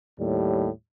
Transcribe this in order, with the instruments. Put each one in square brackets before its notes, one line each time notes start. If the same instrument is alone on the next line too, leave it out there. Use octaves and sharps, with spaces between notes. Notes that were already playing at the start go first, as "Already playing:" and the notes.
[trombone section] D#2 A2 G3